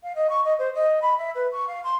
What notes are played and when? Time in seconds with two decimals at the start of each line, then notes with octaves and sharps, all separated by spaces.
0.03 F5
0.15 D#5
0.29 C#6
0.44 D#5
0.58 C5
0.74 D#5
1.02 B5
1.18 E5
1.35 B4
1.52 C#6
1.67 F5
1.84 C6